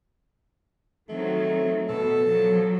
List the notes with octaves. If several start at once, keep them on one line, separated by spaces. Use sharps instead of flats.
D#3 F#3 A3 C4
B2 A4
F3 F#3